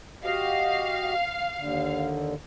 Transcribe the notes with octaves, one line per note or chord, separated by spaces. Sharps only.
F#4 G4 D#5 F5
D#2 D3